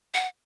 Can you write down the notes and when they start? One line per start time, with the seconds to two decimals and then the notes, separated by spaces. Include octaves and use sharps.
0.14 F#5